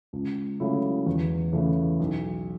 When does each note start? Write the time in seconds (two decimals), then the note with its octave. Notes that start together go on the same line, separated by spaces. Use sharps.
0.13 C#2
0.60 C#3 F#3 A3 E4
1.06 E2
1.53 C#3 E3 A3
2.00 B1